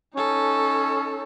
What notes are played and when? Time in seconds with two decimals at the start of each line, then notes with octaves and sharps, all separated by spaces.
0.16 C#4 D#4 A4